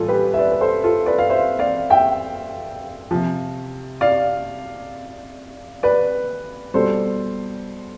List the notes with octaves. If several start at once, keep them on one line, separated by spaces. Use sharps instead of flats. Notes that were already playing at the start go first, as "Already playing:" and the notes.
Already playing: A2 E3 G3 F4 A4
G4 B4
E5
B4 D5
B4
A4 C5
F4 A4
B4 D5
F5
C5 E5
D5 F5
E5 G5
C3 F3
D5 F5
B4 D5
B2 G3 A4 C5